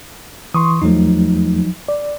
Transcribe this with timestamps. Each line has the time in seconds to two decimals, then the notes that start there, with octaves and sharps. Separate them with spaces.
0.54 E3 C6 C#6 D#6
0.82 E2 F3 F#3 A3 D#4
1.88 D5